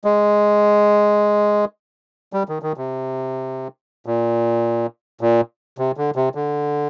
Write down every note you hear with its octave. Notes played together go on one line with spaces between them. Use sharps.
G#3
G3
D#3
D#3
C3
A#2
A#2
C3
D3
C3
D3